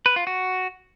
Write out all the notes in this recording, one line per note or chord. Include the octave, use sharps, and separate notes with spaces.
B4
F4
F#4